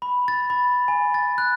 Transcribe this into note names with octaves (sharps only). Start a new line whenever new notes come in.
B5
A6
B5
G#5
A6
F#6